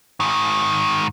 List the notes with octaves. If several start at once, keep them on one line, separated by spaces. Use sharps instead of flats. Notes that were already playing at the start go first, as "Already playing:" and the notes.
G#2 D#3